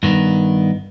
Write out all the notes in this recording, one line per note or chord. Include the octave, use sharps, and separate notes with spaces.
G2 D#3 B3